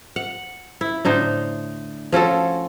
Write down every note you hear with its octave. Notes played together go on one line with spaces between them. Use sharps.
F#5
E4
A2 D3 D#4 C5
F3 C#4 F#4 A4